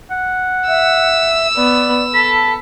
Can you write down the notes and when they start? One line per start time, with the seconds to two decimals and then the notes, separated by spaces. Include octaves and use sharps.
0.11 F#5
0.68 E5 E6
1.56 B3 D5
2.15 A4 A5 B5